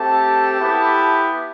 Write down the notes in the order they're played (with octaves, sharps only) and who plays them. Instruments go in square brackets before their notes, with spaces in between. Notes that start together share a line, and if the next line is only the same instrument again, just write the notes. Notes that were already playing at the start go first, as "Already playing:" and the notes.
Already playing: [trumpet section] A3 C4 G4 A4 A5
B3 E4 G4